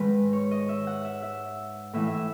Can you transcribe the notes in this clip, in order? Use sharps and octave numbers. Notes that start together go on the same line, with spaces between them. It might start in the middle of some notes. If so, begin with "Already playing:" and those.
Already playing: G#2 D#3 G#3 B4
C#5
D#5
E5
F#5
E5
E5
A2 E3 A3 E5
E5